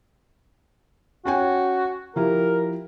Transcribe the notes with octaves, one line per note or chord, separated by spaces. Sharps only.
C#4 F#4 G5 G#5
F3 E4 G4 A#4